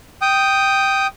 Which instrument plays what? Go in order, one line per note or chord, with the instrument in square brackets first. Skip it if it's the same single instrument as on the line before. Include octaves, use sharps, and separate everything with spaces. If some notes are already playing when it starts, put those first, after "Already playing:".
[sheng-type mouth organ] G5 D#6